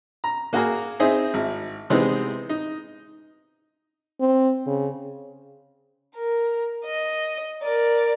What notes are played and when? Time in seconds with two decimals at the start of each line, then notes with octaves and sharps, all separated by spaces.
0.24 A#5
0.53 A#3 F#4 G#4 A#4
1.00 C4 D#4 E4 G#4
1.34 G#1 E4
1.90 C3 E3 G#3 B3 C4 D#4
2.49 D#4
4.20 C4
4.67 C#3
6.15 A#4
6.86 D#5
7.63 A#4 D5